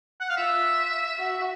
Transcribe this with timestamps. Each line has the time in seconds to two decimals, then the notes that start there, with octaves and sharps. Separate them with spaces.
0.20 F#5
0.29 F5
0.37 F4 E5
1.18 F#4